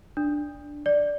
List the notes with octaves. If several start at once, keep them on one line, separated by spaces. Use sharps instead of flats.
D4
D5